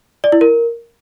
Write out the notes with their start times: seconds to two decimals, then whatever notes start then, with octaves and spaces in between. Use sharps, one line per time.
0.24 D5
0.32 E4
0.41 A#4